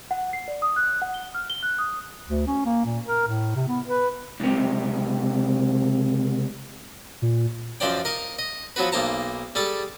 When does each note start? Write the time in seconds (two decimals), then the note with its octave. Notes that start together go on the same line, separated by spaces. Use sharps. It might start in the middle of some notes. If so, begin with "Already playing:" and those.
0.11 F#5
0.33 C7
0.48 D5
0.62 D#6
0.76 F#6
1.02 F#5
1.14 G7
1.34 F6
1.50 G7
1.63 F#6
1.78 D#6
2.29 D2
2.47 C#4
2.66 A#3
2.85 A#2
3.06 A#4
3.28 A2
3.56 C3
3.68 B3
3.87 B4
4.40 C#2 C3
7.22 A#2
7.80 F#2 F3 C5 D5 G5
8.05 A#4 D#5 F5
8.39 D#5
8.76 F3 F#3 B3 F#4 B4
8.92 B1 A#3 D#4 C5 A5 A#5
9.55 G3 G#4 A4 A5